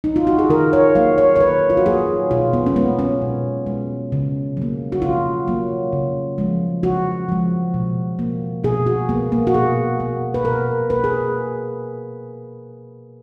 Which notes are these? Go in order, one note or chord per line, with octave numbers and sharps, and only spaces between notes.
D#4
F4
F#4
G#4
D#3 A#4
C#5
F#3 A#3 F5
C#5
C#5
D#3 B4
F4
F#4
F#3 A#3 G#4
B2 F4
B3
C#4
G#3 B3
C#4
B2
G#3
C#3
F#3 A#3
F#4
C#3 F4
F#3 A#3
C#3
F3 G#3
C#3 F#4
F3 G#3
B2
A#3
B2 G#4
F#4
A#3 B3
A#3
F#4
B2 G#4
A#3
B4
B2 A#4
A#3 B4
G#4